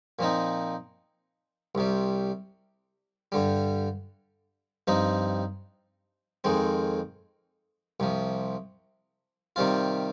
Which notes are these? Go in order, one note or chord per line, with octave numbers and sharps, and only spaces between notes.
A#2 F3 C4 D#4
C2 C3 G3
G2 D3 G3
G2 F3 C4 D#4
F2 D#3 G#3 C4
C2 C3 F3
C3 D#3 G3 C4 F4